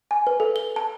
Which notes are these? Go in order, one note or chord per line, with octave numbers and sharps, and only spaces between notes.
G#5
B4
A4
G7
A5